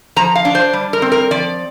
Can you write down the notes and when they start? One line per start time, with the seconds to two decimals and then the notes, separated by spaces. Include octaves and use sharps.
0.16 F3 A#5
0.35 F5
0.45 D4
0.55 C5
0.73 G3
0.93 A#4
1.02 C4
1.12 A#4
1.31 F3 D5